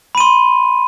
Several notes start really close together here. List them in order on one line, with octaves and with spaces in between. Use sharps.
B5 D#7 C6